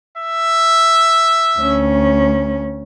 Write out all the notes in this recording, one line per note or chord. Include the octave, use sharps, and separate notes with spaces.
E5
D2 C#4